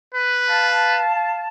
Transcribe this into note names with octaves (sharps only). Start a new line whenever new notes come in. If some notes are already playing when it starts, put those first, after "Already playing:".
B4
F5 A5